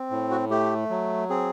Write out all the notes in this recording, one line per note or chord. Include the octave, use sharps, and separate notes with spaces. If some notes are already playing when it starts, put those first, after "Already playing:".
Already playing: C4
A2
F#4
A3 G4
F#3
C4 G#4